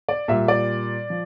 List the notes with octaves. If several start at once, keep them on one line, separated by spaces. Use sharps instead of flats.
D5
A#2 G3 E5
D5
F3